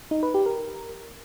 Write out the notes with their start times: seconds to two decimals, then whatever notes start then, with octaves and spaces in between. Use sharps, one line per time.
0.11 D#4
0.23 B4
0.34 G4
0.46 A#4